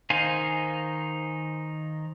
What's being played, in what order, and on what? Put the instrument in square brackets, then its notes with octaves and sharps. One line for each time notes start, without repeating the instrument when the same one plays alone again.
[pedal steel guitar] D#3 D#4 C5 F5 G#5